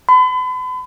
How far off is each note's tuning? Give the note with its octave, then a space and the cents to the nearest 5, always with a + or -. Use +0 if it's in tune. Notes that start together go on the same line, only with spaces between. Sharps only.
B5 +40